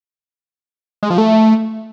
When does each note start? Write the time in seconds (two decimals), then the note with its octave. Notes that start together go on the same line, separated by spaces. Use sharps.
1.03 G#3
1.10 F3
1.18 A3